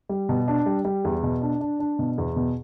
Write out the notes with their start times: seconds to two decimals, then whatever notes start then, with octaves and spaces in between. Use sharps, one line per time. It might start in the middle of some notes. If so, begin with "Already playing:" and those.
0.09 G3
0.29 B2
0.48 D4
0.66 G3
0.85 G3
1.05 E2
1.23 B2
1.42 D4
1.61 D4
1.80 D4
1.99 B2
2.18 E2
2.36 B2